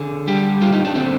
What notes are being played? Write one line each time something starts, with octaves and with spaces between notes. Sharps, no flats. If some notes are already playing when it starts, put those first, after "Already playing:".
Already playing: D3 G#4
G3 G4
G3 F4
D#4
D4
D3 C4